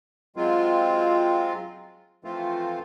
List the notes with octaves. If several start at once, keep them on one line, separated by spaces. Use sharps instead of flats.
F#3 G#3 C4 F4
E3 F3 A3 C4 F4